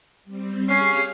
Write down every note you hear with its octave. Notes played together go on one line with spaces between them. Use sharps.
G3 C4
C#4 G4 G#4 F5 C7